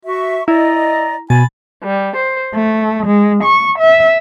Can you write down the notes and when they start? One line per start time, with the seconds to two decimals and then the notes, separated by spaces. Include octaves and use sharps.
0.06 F#4 E5 C#6
0.48 E4 D5 D#5 A#5
1.30 B2 G#5 B5 A6
1.84 G3
2.17 C5
2.56 A3
3.08 G#3
3.45 C#6
3.79 E5